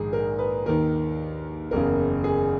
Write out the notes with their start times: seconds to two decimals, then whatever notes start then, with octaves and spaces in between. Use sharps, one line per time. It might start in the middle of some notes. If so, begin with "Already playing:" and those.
Already playing: A#1 G#2 D#3 G#4
0.13 A#4
0.39 B4
0.66 D#2 D#3 A#4
1.71 F#1 E2 C#3 A#4
2.24 G#4